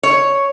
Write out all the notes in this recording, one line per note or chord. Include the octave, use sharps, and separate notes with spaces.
C#5